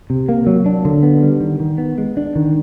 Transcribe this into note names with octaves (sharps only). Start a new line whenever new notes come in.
C3
A#3
F#3
D4
D3
B3
G3
D#3
D#3
B3
G#3
D4
D#3